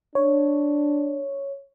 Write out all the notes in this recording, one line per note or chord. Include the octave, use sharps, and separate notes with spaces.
D4 C#5